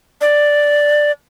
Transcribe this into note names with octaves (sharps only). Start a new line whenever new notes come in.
D5